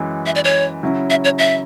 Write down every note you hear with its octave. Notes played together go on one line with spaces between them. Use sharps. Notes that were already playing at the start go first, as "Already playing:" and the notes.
Already playing: F#2 E3 G#3
E5
D5
C#5
C#3 F#3 C#4 E4
E5
C#5
E5